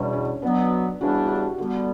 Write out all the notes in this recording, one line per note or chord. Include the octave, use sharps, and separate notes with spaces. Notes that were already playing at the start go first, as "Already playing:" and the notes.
Already playing: E2 B2 G3 C#4 D4
C#4
B2 F#3 B3 D4
C#3 E3 G3 B3 D4 F#4
F#4
G4
D3 G3 B3 F#4